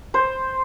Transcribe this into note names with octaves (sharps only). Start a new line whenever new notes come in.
C5